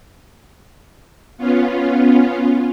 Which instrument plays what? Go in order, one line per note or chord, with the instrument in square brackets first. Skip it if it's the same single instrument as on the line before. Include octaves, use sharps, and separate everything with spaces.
[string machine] B3 C#4 F4